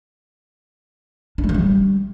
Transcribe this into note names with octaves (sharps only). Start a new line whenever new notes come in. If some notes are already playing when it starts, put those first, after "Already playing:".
D4
G3
F3
G3